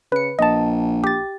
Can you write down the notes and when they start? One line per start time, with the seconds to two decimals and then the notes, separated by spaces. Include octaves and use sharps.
0.12 C#3 B4 C#7
0.39 A#1 D#5 A5
1.04 G4 A6